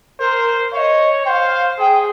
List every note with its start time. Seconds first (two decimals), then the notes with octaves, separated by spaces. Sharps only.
0.19 A#4 C5
0.72 C#5 D#5 F5
1.25 C5 F5 G5
1.79 G#4 G5